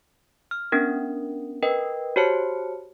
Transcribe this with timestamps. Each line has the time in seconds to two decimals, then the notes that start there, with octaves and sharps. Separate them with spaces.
0.51 F6
0.72 B3 C#4 D4 A#4
1.63 A#4 B4 D#5 G5
2.16 F#4 G4 C5 C#5 A5 C#7